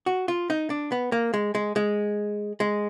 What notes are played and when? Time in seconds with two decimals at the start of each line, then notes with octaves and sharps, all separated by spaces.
0.06 F#4
0.28 F4
0.50 D#4
0.70 D4
0.92 B3
1.12 A#3
1.34 G#3
1.55 G#3
1.76 G#3
2.60 G#3